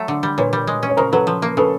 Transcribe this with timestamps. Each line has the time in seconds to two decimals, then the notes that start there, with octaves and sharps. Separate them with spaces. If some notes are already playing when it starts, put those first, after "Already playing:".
Already playing: F#3 A3
0.08 D3
0.23 G3
0.38 A#2 B4 C#5
0.53 G3
0.67 G#3
0.83 C#4
0.89 C#5
0.97 C#3 A#4 C5
1.12 F#3 A4 B4
1.27 F3
1.42 A#3
1.57 C#3 A4 B4